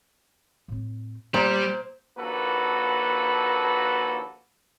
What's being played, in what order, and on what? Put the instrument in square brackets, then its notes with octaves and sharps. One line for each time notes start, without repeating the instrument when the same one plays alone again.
[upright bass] A2 C4
[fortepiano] A#2 [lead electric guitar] G3 [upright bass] B3 [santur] C5
[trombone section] A#1 D#2 A#3 F#4 A4 B4